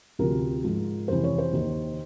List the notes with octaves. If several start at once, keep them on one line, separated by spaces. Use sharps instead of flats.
D2 C3 F3 A#4
G#2 F3
F2 C3 E3 C5
C#5
C5
D#2 D#3